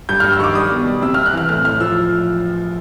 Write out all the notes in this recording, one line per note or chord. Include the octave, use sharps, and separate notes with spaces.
G2 G6
G2 F6
E6
D#3 C#6 D6
G3 D#6
B2
G3
C3 E6
C3 F6
F#6
E3 F6
A2 F6
A2 F6
F3 E6